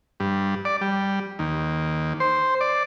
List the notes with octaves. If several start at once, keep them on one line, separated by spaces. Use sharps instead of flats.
G2
D5
G3
D#2
C5
D5